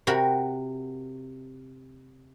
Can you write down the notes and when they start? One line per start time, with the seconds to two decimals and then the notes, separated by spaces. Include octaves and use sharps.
0.07 C3 F#4 A#4 B5